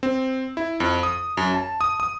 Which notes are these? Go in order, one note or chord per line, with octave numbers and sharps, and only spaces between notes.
C4
E4
F2
D#6
F#2
A5
D#6
D#6